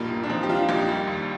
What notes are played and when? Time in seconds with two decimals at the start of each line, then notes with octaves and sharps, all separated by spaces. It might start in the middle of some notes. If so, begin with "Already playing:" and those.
Already playing: A#1 G2 A#2 D#4 G4
0.10 A#2
0.24 D4
0.30 F3 C4 D#4
0.43 G4
0.49 F3 D4 F4
0.69 A#1 D#4 G4
0.88 G3
1.07 D#2